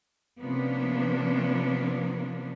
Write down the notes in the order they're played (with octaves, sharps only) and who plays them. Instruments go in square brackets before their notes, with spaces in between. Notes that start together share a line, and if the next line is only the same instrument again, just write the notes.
[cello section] C3 F3 A#3 B3 C#4 D4